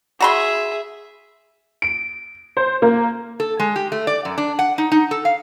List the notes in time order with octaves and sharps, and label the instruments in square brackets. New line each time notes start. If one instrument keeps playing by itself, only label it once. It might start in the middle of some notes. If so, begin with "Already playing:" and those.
[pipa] F#4 A#5 C6 [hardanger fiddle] G#4 E5
[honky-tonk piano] D7
C5
A#3
[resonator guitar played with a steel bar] A4
G#3
G4
A3
D5
F#2
D4
F#5
D#4
D#4
A4
F5